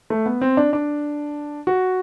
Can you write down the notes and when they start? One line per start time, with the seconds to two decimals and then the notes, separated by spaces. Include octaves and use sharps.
0.10 A3
0.26 B3
0.41 C4
0.57 D4
0.73 D4
1.67 F#4